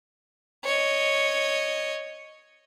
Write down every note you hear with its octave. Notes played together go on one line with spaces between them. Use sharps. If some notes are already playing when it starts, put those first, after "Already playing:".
C#5 D#5